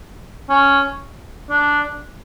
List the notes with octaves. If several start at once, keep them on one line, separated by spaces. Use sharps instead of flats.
C#4
D4